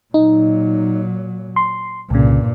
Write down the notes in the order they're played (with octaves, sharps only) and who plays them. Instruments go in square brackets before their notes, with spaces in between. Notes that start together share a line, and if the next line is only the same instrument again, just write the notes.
[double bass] A#2 F#3 [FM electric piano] D#4
[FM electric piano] C6
[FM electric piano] C2 C#3 [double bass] G2 A#2